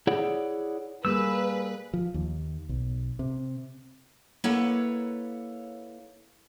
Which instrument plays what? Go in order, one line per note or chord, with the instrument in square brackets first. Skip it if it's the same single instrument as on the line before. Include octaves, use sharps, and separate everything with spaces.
[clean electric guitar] E4 G#4 C#5 D5 F#5
[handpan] G3 A#3 G#4 [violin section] B4 [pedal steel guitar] E6
[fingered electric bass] F3
D#2
B1
C3
[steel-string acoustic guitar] A#3 E4 A4 B4 C#5 F#5